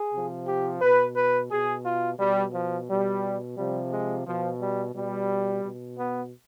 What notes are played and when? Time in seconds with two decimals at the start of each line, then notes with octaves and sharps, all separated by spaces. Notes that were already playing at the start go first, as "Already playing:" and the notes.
Already playing: G#4
0.13 C3 F3
0.48 G4
0.82 B2 B4
1.16 B4
1.51 B2 G#4
1.85 F4
2.20 B2 G3
2.54 F3
2.89 B2 G3
3.57 C3 F3 G3
3.93 G#3
4.27 B2 F3
4.61 G3
4.95 B2 G3
5.64 B2
5.99 B3